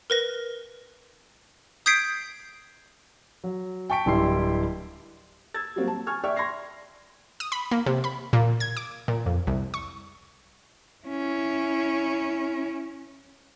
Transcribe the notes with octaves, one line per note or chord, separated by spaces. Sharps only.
A#4 B4 A#6
D#6 G6 G#6 B6 C7 D7
F#3
G5 A5 C#6 B6 D7
D1 G3 E4 G4 C6 C7
E6 G#6 A6
F#3 G3 A#3 C4 F#4
A5
G#5 C#6 F6 G#6
D5 E5 G5 C#6 F6
C6 C#6 G#6 A#6 C7
D#6
B5
A#3
C3
B5
A#2
G#6
D6
A#2
F2
C2
C#6
C#4 E4